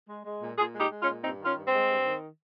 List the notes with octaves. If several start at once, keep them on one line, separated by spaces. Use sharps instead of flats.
G#3
G#3
A#2
A#2 F4 G#4
G#3
D#4 G4
G#3
C#4 F4
A#2
G2 C4 D#4
D#3 C#4 F4
G2
G#3 C4
G2
D#3